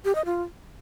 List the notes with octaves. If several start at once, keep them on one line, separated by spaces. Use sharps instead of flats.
G4
D#5
F4